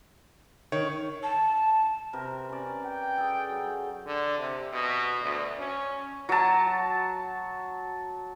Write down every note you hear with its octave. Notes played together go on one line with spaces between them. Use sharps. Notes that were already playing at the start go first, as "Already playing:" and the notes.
D#3 C#5
A5
C3 A#4 B4
C#4 D5
G5
G#4 A4
F#3
D3
C3
B2
D2
C#4
F#3 A5